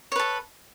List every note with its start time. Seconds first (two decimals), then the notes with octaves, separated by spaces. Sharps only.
0.12 C#5
0.16 B4
0.20 A4